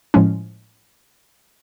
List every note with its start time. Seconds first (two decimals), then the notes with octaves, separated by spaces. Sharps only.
0.14 A2 F3 G#3 C#4